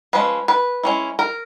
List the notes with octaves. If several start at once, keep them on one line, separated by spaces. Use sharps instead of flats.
F3 G#3 C#4 B4
B4
G#3 C#4 E4
A#4